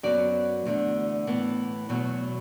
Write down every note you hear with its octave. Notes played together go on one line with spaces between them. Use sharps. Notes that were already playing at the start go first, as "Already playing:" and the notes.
F#2 F#3 B3 D5
E2 D3 A3
A2 E3 B3
E2 B2 F#3 A3